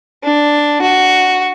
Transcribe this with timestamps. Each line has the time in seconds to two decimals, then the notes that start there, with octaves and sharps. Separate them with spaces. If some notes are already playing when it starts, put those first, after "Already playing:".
0.24 D4
0.82 F#4